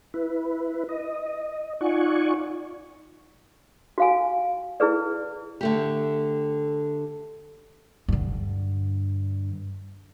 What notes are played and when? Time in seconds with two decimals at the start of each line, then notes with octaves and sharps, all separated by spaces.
0.14 E4 B4
0.89 D#5
1.81 D#4 F4 D5 F#5 G#5 C#6
3.98 F#4 F5 G#5
4.80 E4 G#4 B4 D5
5.61 D3 A3 G4
8.08 G2 D3